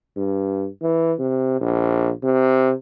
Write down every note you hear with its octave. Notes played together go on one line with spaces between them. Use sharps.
G2
E3
C3
A#1
C3